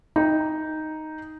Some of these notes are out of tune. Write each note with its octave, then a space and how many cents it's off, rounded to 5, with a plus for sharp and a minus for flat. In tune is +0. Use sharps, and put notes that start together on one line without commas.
D#4 +0 G5 +10